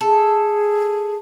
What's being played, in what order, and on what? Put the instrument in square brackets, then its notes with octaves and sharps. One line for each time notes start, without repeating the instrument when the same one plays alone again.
[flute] G#4 [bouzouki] A4